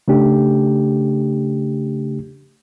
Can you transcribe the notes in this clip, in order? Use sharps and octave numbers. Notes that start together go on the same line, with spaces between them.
C#3 A3 D4 G4